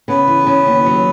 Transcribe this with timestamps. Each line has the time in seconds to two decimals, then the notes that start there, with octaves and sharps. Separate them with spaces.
0.08 C#3 B3 B4
0.27 E3
0.47 C#3
0.67 D#2
0.86 F#3